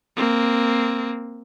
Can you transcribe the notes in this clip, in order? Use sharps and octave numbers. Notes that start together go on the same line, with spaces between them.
A#3 C4